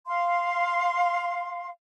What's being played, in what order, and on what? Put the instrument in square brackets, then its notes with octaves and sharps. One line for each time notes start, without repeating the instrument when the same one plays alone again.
[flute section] F5 C6